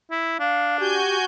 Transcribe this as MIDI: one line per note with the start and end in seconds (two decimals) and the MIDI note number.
0.11 0.38 64
0.39 0.99 62
0.39 0.77 77
0.80 1.25 66
0.80 1.17 67
0.80 1.25 80
0.80 1.25 91